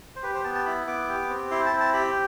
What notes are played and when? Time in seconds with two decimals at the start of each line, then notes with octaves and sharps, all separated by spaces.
0.16 C5
0.23 G4 B4
0.35 C5
0.44 B3 A5
0.55 A5
0.66 E4 B5
0.87 B3 D6
1.09 G4
1.30 C4
1.51 E4 C6
1.66 A5
1.73 C4
1.80 A5
1.94 G4 B5